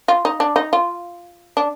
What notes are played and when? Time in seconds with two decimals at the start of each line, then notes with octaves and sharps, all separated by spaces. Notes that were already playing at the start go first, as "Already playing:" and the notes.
0.08 F4
0.25 D#4
0.40 D4
0.56 D#4
0.73 F4
1.57 D4